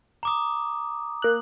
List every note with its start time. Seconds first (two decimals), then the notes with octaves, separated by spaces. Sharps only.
0.23 A#5 D6 D#6
1.22 A#3 F#6